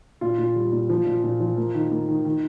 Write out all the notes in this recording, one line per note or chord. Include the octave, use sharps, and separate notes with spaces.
A#2 F4
A#2
G3
A#2
F3
A#2
A#2
F3
A#3
D#3
A#3
D#3
D#3